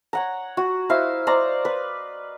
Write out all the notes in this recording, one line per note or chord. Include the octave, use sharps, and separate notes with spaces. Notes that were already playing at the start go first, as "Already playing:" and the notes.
C#5 F#5 A#5
F#4
E4 C5 D#5 F5
C5 D5 D#5 A#5
B4